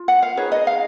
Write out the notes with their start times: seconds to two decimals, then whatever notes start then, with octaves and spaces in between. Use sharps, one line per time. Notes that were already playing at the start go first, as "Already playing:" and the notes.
Already playing: F4
0.08 F#5
0.22 F5
0.37 D#4 G#4 B4 C#5
0.52 D#5
0.67 F5